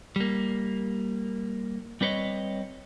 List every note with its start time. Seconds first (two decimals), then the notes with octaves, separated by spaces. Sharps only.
0.16 G3 A#3
2.01 G3 C4 B4 C#5 D#5